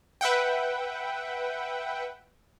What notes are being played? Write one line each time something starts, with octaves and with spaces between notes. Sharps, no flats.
B4 E5 F#5 G5